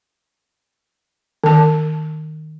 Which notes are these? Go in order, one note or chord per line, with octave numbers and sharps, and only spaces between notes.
D#3 A5